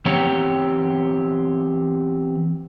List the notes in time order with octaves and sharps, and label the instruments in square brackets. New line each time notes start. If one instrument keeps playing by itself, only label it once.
[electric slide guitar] E3 B3 C4 G4 C#5 A#5